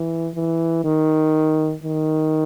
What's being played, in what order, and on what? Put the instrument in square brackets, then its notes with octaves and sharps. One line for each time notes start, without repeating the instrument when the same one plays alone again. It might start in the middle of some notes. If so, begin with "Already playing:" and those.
Already playing: [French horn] E3
E3
D#3
D#3